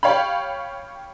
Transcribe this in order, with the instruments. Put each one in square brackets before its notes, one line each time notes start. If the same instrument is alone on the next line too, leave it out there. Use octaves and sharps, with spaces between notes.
[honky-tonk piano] G4 C#5 F5 G5 B5